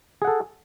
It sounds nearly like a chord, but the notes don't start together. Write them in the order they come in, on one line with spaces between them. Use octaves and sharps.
G#4 F#5 A4